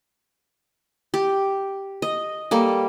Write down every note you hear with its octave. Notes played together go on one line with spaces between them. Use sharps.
G4
D#5
G3 A#3 A4